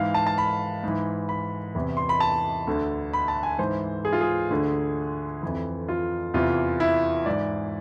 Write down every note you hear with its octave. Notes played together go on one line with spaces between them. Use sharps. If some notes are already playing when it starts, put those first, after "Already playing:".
Already playing: G#2 E3 F5
A5
A5
B5
G#2 E3
B5
E2 C3 E3
C6
B5
A5
D2 D3
B5
A5
G#5
G#2 E3 C5
G#4
F4
G#4
D2 D3
F2 E3
F4
E2 C3 E3 F4
E4
G#2 E3 D5